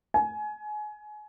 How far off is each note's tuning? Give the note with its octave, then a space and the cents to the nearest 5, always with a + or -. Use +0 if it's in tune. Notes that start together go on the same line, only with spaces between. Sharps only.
G#5 +25